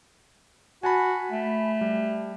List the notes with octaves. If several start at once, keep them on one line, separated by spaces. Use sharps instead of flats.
F#4 G#5 A5 B5
A3
G3